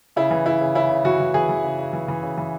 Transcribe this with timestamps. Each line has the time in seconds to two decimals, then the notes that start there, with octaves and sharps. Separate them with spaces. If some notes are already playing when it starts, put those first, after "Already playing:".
0.16 C#3 E4
0.31 E3
0.46 C#3 E4
0.61 C#3
0.75 C#3 E4
0.90 C#3
1.05 E3 F#4
1.20 E3
1.34 E3 G#4
1.49 E3
1.64 C#3
1.78 C#3
1.93 E3
2.08 E3
2.23 C#3
2.38 E3